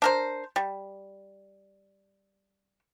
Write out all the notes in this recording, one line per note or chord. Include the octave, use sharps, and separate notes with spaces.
D4 A#4 C5
G3